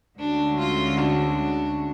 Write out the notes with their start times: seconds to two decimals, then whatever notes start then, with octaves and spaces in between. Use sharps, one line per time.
0.18 D2 D3 G#3 C#4 D4 F#4
0.59 F4
0.98 D4